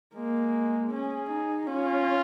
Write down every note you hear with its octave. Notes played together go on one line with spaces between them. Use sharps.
G#3 A#3
C#4 G#4
D#4
C#4 F4